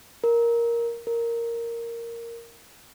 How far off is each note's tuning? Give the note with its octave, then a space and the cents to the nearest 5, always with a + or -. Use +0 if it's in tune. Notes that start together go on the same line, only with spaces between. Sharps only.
A#4 +5
A#4 -5